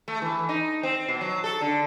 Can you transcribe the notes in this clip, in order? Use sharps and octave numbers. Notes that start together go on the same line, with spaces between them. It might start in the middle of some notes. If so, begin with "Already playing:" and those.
A3
E3
D#4
C4
B2
F#3
A4
D3